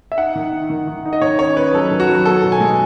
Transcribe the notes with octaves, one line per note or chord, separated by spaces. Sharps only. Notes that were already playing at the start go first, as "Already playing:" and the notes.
E5
D#4 F#5
D#3
D#4
D#3
D#3
D#4
D#5
D#3 C#5
C#4 C#5
C#4 B4
F#3 A4
D#3
F#4
F#3
B3 A4
B2
G#5
G#3